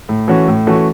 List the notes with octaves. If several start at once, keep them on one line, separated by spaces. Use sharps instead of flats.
A2
E3 A3 C#4 F#4
A2
E3 A3 C#4 F#4